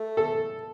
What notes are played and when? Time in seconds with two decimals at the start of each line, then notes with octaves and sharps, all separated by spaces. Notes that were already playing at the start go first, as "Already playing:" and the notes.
Already playing: A3
0.17 A4